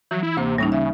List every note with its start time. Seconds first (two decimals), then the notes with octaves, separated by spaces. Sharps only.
0.11 E3 F#3
0.23 E4
0.37 D2 C3 A#3 C5
0.58 A2 G3 C#4 D#4
0.72 C#3 E5